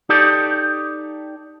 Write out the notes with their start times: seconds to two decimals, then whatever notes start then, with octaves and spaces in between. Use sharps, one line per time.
0.09 D#4 G4 A4 D5